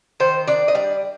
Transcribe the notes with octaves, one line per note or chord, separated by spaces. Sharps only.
D#3 C5
D4 D5
D#5
G3 D5